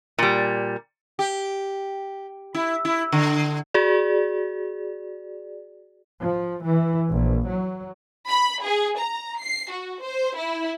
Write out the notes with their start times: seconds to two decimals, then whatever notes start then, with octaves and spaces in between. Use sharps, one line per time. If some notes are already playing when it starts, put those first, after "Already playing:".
0.19 A#2 G3
1.19 G4
2.55 E4
2.85 E4
3.12 D3
3.74 F#4 G#4 D5
6.21 F3
6.63 E3
7.10 A#1
7.47 F#3
8.30 B5
8.64 G#4
8.98 A#5
9.41 C7
9.71 F#4
10.03 C5
10.37 E4